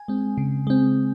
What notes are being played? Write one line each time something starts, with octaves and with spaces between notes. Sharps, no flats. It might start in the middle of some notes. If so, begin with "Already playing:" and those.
Already playing: G#5
G#3 C4
C#3
G#3 C4